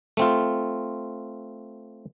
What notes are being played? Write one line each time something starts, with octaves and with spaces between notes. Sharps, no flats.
A3 C4 F4